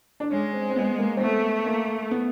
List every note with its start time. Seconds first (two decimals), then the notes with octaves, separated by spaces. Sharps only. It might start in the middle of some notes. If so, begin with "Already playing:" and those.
0.20 D4
0.31 G#3 C#4
0.54 C4
0.70 C4
0.76 B3
0.98 A#3
1.17 C4
1.21 A3 B3
1.66 A#3
2.11 B3